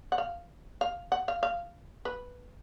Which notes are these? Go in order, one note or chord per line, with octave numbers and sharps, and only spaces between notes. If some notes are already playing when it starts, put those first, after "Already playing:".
F#5
F5
F5
F#5
F5
F5
B4